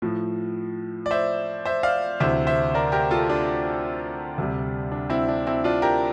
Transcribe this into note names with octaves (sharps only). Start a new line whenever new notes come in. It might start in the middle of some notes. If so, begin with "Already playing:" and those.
A2 F3
D5
C5 E5
C5 E5
D5 F5
D2 C3 E3 C5 E5
C5 E5
A#4 D5
G4 A#4
F4 A4
D4 F4
D2 C3 G3
D4
C4 E4
D4
C4 E4
D4 F4
G4 A#4